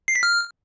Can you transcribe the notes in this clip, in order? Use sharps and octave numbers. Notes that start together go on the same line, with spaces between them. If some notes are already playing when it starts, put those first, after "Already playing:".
C7
B6
F6